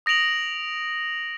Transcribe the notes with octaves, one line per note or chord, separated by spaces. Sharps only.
D#6 A#6 D7 F7 F#7